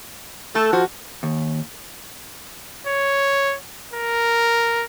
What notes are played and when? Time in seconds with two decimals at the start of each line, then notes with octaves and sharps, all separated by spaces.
0.55 A3 A4
0.73 F3 F#4
1.23 D#2
2.87 C#5
3.93 A#4